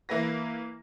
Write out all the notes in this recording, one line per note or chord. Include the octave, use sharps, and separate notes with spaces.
E3 A#3 E4 B4 A#6